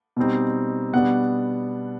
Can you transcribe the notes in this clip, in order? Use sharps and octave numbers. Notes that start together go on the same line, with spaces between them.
B2 G3 C4 D#4
B2 G3 B3 D4 F#5